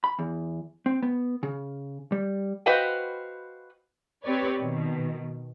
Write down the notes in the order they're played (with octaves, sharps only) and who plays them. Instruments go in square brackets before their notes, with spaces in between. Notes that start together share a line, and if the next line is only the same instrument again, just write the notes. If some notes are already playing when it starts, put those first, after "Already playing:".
[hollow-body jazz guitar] B5
E2
C4
B3
C#3
G3
[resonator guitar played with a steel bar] F#4 B4 C5 D#5 F5 G5
[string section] C4 G4 B4 C#5 D5
B2 D#3